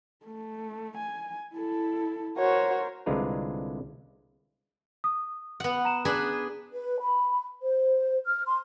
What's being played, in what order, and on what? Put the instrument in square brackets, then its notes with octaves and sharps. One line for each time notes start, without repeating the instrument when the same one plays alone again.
[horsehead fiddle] A3
G#5
E4 A4
[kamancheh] F#4 C#5 [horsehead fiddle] A#4 C5
[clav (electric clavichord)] C2 D3 G#3 F4 B4 A#5
[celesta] D#6
[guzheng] B3 F#5
[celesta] A#5 E7
[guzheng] D4 G#4 B4
[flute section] B4
B5
C5
F6
C6